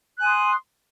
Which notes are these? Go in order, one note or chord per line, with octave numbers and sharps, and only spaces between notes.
G#5 C6 D#6 F#6